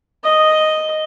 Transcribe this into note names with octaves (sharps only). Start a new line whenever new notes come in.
D#5